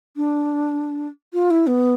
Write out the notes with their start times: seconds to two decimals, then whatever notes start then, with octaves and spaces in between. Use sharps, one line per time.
0.16 D4
1.33 F4
1.50 E4
1.67 B3